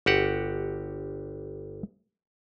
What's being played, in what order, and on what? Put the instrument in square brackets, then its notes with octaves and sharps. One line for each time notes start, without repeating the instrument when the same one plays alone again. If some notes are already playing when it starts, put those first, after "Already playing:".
[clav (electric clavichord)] G1 F#4 G4 F#5